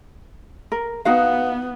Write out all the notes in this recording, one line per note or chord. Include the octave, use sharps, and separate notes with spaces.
A#4
B3 D#4 F#4 F5